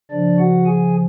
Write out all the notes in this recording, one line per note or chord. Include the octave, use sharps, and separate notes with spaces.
C#3 F3 D4 D5
F#4 F#5
G#4 G#5